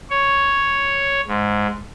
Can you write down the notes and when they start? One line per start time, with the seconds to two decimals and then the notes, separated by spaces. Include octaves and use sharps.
0.10 C#5
1.27 G#2